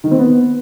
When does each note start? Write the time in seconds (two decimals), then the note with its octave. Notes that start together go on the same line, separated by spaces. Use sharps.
0.04 D#3
0.11 C4
0.19 B3